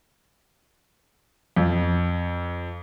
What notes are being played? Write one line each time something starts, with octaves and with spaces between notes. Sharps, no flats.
F2